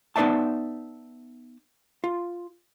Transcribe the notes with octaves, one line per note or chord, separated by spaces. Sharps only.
B3 D#4 B4 D5 E5 A5
F4